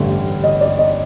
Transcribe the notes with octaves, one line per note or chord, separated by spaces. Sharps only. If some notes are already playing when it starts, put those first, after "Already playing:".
Already playing: A1 G2 D3
D#5
D5
D#5